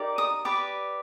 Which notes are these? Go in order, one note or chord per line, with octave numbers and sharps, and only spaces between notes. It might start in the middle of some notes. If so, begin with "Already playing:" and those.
Already playing: D#4 G4 A#4 D5
D#6
G4 B4 D5 D6